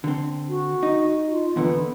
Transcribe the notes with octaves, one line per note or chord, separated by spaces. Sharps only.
D3 C4
F#4
D#4
F4
E2 A#2 D3 B3